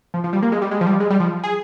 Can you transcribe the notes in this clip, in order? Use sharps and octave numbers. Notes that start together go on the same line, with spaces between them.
F3
F3
G3
A#3
G#3
G3
G#3
F3
G3
G#3
G3
F3
G#4